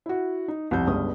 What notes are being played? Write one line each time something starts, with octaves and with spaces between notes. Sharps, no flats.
E4 F#4
D#4
C2 F2 G6
G1 C#2 G2 D#6